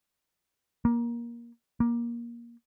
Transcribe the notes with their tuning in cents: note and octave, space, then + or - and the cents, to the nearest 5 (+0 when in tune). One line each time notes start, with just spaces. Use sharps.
A#3 +20
A#3 +20